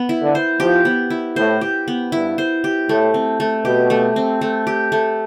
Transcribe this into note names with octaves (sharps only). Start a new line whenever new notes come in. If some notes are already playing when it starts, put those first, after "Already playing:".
Already playing: B3
E4
D3
C5
F3 G4
B3
E4
A2 C5
G4
B3
G2 E4
C5
G4
A2 A3
C4
A3
B2 G4
A3
C4
A3
G4
A3